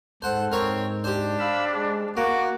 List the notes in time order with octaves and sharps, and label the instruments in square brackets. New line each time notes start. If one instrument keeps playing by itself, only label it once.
[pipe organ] G#2 A4 [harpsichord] C5 F#5
[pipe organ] G#2 [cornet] C4 [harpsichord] A#4 C#5
[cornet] D4 [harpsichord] G4 C5
[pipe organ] F5 B5 E6
G#3
[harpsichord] A#3 [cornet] F#4 [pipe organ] D6